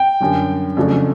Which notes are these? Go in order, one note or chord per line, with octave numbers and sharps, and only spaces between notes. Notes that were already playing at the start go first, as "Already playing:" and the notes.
Already playing: G5
F#2 D3 G3
F2 C#3 F#3 A3 D4